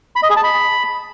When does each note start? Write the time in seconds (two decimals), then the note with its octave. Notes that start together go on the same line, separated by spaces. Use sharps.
0.16 B5
0.23 D#5
0.30 G#4
0.37 A5
0.44 B5